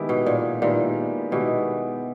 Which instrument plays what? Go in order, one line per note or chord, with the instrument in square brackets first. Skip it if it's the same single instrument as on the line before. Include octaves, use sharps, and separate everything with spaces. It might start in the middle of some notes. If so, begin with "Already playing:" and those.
Already playing: [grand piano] D#3 G#3 B3 E4 G4
[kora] B2
A#2
[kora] A#2 [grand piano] D#3 G#3 B3 E4 G4
[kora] B2 [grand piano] D#3 G#3 B3 E4 G4